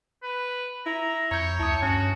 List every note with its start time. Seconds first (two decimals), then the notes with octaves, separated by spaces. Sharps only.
0.23 B4
0.86 E4 A#5
1.31 F2 C#5 A#5 G6
1.59 D2 E4 A5 D#6
1.82 G2 C#4 F#4 G#5